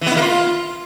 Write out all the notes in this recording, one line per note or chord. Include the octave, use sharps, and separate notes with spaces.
E3
B3
E4
A#3
F4